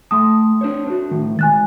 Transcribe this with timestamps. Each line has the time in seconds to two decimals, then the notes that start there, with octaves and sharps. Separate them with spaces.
0.11 A3 G5 A5 C6 D#6
0.61 D4 C5 C#5
0.87 D4 F#4
1.11 A2 D#3
1.39 D#3 G#3 G#5 F#6 A6